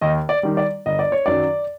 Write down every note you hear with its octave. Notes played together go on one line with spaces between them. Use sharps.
D#2 D#5
D5
D#3 G3
D5
G1 D#5
D5
C#5
F#2 D#3 F#3 D5